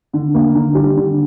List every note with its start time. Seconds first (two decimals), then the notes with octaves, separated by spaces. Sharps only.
0.13 D3
0.34 A#3
0.55 D3
0.75 G3
0.96 D3